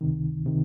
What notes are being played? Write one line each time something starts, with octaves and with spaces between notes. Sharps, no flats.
C#2 C3 D#3
C3 D#3